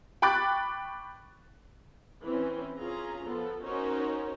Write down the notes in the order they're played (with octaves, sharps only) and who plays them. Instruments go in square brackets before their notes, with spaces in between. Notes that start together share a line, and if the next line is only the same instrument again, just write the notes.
[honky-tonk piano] G5 B5 C#6 D6 F#6 A6
[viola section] E3 C4 C#4
C#4 F4 G#4 A#5
F3 B3 A4
C#4 D#4 F#4 A#4 C5 C#5